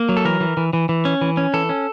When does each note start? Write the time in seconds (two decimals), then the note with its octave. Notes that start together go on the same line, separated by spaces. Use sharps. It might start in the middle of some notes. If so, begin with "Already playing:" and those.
Already playing: A#3
0.09 F#3
0.17 A4
0.25 E3 A#4
0.40 E3
0.57 E3
0.73 E3
0.89 E3
1.05 C#4
1.21 E3
1.37 C#4
1.54 E3 A4
1.69 C#4